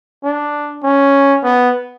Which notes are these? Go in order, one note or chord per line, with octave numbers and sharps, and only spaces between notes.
D4
C#4
B3